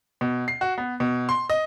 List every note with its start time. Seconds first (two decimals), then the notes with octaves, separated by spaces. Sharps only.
0.21 B2
0.48 C7
0.61 F#4
0.78 B3
1.00 B2
1.29 C6
1.50 D#5